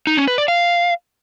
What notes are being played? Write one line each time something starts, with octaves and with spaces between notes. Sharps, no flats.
D#4
C#4
B4
D5
F5